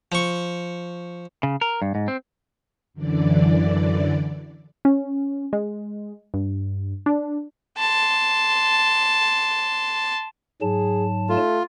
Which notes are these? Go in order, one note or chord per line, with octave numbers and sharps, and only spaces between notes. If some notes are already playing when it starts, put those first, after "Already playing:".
F3 C#6
C#3
A#4
G2
G#2
C4
F#2 D3 E3 D5
C#4
G#3
G2
D4
A5 C6
G#2 F#3 G#4 A5
A3 F4